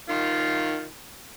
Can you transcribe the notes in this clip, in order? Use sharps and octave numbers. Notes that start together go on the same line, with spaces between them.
D#3 F4